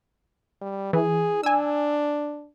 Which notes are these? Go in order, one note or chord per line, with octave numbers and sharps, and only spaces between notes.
G3
E3 G#4
D4 G#5 E6